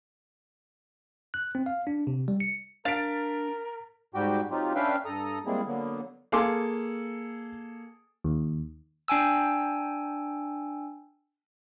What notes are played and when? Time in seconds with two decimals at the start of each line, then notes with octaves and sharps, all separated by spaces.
1.34 F#6
1.55 C4
1.66 F5
1.87 D4
2.07 C3
2.28 G3
2.40 C#7
2.85 D4 A#4 F5 A6 B6 D7
4.14 G#2 G3 F#4 G4 G5
4.50 F#3 C4 D#4 F4 G4
4.75 C#4 D4 B4 E5 F5 G5
5.05 G2 A4 A#5 D#6
5.46 G3 G#3 A#3 C4 E4 G#4
5.66 D3 F#3 A#3 B3
6.32 A#3 G#4 A4 F5 C6 D6
8.24 D#2
9.08 D4 G5 G#5 E6